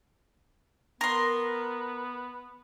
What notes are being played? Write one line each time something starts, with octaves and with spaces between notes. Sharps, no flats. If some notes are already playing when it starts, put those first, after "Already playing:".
B3 A#4 C6